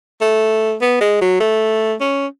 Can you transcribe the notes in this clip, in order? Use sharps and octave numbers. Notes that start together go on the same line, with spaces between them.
A3
B3
G#3
F#3
A3
C#4